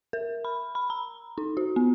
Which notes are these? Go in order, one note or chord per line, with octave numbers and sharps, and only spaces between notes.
A#4
B5
B5
A#5
D#4
F#4
B3